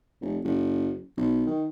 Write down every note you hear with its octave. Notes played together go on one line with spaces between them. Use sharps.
F1
F#1
B1
D#3